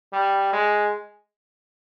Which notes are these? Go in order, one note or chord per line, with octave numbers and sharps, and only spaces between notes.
G3
G#3